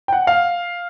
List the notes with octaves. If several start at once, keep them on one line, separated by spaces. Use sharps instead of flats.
G5
F#5
F5